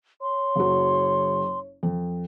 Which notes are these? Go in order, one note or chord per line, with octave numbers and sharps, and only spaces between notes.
C#5 C6
F#1 F#3
F2